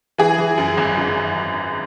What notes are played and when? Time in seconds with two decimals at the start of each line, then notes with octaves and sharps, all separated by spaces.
0.18 E3 G#4
0.38 E3
0.58 F#2
0.78 G#1
0.97 F#2